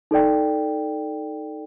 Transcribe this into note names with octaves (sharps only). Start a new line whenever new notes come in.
D#4 A4 D5 G5